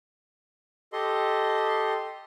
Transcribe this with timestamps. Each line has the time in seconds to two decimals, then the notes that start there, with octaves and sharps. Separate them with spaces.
0.93 G4 A4 D#5 C6